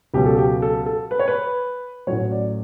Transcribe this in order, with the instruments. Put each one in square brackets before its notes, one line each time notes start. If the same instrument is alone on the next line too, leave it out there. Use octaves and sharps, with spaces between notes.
[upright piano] C#2 B2 F#3 G4
A4
G4
A4
A4
B4
C#5
B4
A1 A2 F#3 C#5
D5